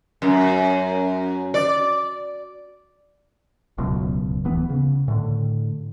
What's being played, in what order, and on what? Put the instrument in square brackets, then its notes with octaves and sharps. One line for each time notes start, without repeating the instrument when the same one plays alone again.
[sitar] F#2
D5
[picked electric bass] D1 C#2 F#2 B2
D1 E3 B3
C#3
A2 D3